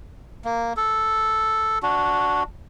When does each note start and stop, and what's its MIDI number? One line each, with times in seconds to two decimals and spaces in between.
0.45 0.73 58
0.77 1.79 69
1.83 2.43 62
1.83 2.43 66